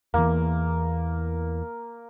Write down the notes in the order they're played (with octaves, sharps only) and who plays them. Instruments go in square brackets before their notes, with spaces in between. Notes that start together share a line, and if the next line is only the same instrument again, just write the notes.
[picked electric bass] E2 E3 [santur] A#3